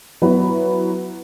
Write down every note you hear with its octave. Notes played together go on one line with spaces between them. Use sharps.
F#3 B3 E4 F#4 B4